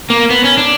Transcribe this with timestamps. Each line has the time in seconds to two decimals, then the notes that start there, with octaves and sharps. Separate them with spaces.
0.10 A#3
0.30 B3
0.44 C#4
0.58 D4